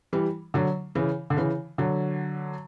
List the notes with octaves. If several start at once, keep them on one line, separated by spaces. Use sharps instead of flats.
E3 G3
D3 F#3
C#3 E3
D3
C#3 E3
D3 F#3